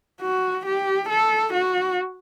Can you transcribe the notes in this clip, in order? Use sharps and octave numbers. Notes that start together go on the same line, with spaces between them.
F#4
G4
A4
F#4